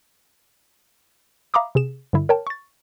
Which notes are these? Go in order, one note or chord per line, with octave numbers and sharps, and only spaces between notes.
E5 F5 A#5 B5 D6 D#6
C3 G#4 E7
G2 D3 E4
A#4 C#5 G5 A5
C#6 A6